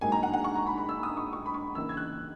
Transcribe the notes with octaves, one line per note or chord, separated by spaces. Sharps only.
G#2 F#3 A#3 D#4 G#5
A#5
F#5
F#5
C#6
A#5
B5
B5
E6
D#6
C#6
C#6
B5
C#6
C#3 E3 A#3 D#4 E6
G#6
F#6